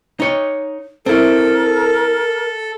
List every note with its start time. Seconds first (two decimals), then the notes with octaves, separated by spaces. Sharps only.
0.20 D#4 C#5
1.06 C4 E4 A4 A#4